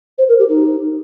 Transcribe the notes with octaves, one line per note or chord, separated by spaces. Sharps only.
C5
A#4
G4
D#4